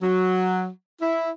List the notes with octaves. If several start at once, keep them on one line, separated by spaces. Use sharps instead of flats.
F#3
E4